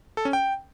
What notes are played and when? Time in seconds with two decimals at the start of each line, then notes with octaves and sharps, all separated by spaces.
0.17 A4
0.25 C#4
0.33 G5